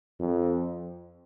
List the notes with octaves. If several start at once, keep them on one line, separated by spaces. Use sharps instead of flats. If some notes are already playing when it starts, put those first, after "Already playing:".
F2